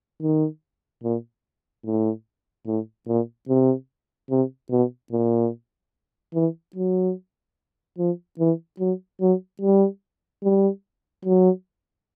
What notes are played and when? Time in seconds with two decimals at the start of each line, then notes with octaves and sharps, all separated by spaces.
0.22 D#3
1.03 A#2
1.85 A2
2.66 A2
3.07 A#2
3.48 C3
4.30 C3
4.71 B2
5.12 A#2
6.34 E3
6.76 F#3
7.98 F3
8.39 E3
8.80 F#3
9.21 F#3
9.62 G3
10.44 G3
11.25 F#3